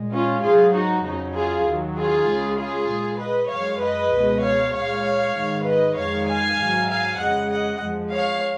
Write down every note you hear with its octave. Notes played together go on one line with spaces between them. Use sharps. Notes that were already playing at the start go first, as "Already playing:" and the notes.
Already playing: A#2 G#3
C#4 F4
G#2 F#3 F4 G#4
D#4 F#4
F2 C#3 F#3 D#4
F4 G#4
D#2 D#3 F#3
F4 G#4
C#2 C#3 G#3
F4 G#4
A#2 G#3
B4 D#5
F#2 F3 G#3 C#5 F5
B4 D#5
C#2 B2 G#3
C#5 F5
A#2 G#3 C#5 F5
G#2 D#3 G#3
B4 D#5
F2 D#3 G#3 C#5 F5
F5 G#5
G#2 F#3
F5 G#5
F2 C#3 G#3 D#5 F#5
D#5 F#5
F2 F3 G#3
C#5 F5